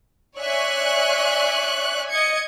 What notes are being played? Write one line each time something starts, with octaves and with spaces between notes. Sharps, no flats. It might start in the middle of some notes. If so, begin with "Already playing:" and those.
C#5 D5 E5 G#5 C#6 F#6
D#5 G#6 C#7